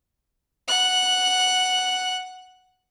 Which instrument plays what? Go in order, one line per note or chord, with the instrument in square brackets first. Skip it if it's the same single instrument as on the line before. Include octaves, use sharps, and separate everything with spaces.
[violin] F#5 F#6